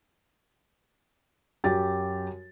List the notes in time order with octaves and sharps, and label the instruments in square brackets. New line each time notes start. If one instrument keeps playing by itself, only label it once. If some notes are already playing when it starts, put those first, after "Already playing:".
[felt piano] F#2 G4 A6